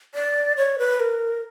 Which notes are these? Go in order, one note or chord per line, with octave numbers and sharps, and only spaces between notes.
D5
C#5
B4
A#4